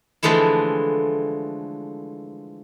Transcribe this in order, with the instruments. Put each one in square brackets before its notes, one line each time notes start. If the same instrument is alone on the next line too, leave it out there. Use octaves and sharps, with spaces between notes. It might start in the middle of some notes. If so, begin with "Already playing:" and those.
[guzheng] D3 E3 F3 G#3 A3 E4